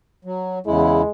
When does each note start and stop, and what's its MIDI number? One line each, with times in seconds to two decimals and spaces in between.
0.25 0.59 54
0.66 1.02 40
0.66 1.02 49
0.66 1.10 56
0.66 1.02 64